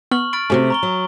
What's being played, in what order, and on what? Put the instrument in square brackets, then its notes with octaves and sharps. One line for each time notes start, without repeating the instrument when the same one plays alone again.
[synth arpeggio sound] B3 [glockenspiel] C#6 F6 F#7
[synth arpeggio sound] B5 [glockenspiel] F6 A6 D7
[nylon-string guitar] C3 A3 [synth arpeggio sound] C#4 F#4 C6
[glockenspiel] A#5 C#6 G7
[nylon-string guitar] F#3